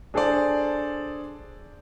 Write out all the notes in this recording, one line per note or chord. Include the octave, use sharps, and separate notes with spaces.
D4 G#4 A4 C5 D5